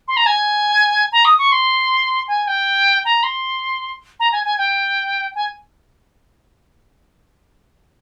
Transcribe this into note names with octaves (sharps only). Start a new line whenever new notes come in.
C6
A#5
G#5
A#5
D#6
C#6
C6
G#5
G5
A#5
C6
A#5
G#5
G#5
G5
G#5